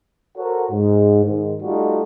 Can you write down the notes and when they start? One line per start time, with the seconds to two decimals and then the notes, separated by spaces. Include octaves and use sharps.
0.37 F#4 A4 A#4 C5 C#5 F#5
0.72 G#2
1.25 G#2 D#3
1.61 G3 A3 D#4 F4 F#4 A4